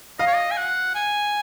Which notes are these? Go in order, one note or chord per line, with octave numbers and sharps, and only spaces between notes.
D#5 F5
C#5
D#5
G#5
F#5
G#5